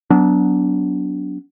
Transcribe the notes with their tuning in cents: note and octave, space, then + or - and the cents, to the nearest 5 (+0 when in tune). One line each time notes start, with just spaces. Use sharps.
F#3 +5 B3 +0 D4 -25